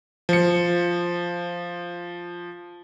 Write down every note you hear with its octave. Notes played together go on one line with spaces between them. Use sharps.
F3 C#7